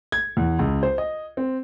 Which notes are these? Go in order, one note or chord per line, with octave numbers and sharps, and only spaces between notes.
G#6
E2
C#2
C5
D#5
C4